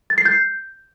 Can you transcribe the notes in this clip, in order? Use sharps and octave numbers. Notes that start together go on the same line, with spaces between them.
A6
C7
G6